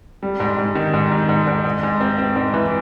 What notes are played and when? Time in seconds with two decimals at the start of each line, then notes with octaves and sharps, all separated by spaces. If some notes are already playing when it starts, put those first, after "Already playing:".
0.23 G3
0.40 G#2
0.58 G#2
0.75 D#3
0.94 G#2
1.12 D#3
1.29 G#2
1.47 G#2
1.65 G#2
1.83 G#2
2.01 C4
2.18 C4
2.36 G#2
2.54 E3